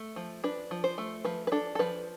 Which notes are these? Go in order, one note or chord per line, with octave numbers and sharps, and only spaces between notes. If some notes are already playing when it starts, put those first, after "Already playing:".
Already playing: A3
F3
D4 B4
F3
C5
A3
F3 B4
B4
D4 A4
A4
F3 B4